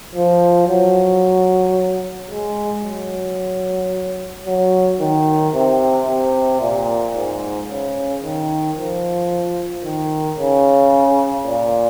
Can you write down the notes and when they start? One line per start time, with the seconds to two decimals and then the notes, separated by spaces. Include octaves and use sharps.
0.15 F3
0.69 F#3
2.30 G#3
2.84 F#3
4.46 F#3
5.00 D#3
5.54 C3
6.08 C3
6.61 A#2
7.15 G#2
7.69 C#3
8.23 D#3
8.76 F3
9.84 D#3
10.39 C#3
11.46 A#2